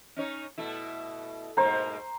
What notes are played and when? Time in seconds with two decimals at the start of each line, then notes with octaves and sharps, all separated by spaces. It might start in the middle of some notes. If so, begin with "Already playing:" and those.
0.16 C#4 D#4 C#5
0.58 B2 A3 E4
1.57 G#2 B2 A#3 C5 A#5